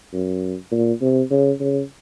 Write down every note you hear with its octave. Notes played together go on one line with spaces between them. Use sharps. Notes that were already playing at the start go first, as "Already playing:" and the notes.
F#2
A#2
C3
C#3
C#3